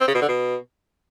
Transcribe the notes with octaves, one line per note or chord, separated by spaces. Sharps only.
C4
C#3
B2
D3
B2